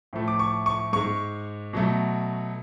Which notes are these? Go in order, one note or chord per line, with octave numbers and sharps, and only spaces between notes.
A2 F3 A3
D6
C#6
C#6
G#2 G#3 C#6
B2 F#3 A3